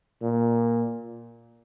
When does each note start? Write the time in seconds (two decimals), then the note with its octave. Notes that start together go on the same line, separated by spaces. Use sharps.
0.22 A#2